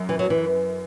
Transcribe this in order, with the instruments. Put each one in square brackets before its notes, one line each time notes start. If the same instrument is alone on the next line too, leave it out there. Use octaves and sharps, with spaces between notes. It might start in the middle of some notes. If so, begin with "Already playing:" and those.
Already playing: [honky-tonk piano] F#2
[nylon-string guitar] E3
F#3
E3